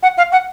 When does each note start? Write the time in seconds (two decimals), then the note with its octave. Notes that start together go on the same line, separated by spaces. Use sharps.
0.03 F#5
0.17 F5
0.32 F#5